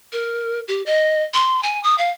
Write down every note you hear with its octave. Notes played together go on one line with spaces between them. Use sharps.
A#4
G4
D#5
C6
G#5
D#6
F5